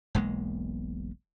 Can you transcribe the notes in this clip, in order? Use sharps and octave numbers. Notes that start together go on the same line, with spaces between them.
E1 B1 G#3 A#3